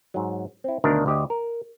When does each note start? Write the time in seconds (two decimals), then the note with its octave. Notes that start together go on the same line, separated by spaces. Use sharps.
0.14 G#2 F#3
0.64 C4 E4
0.84 D2 B2 D#3 D4 A#4
1.06 D2 G4 D#5
1.30 A#4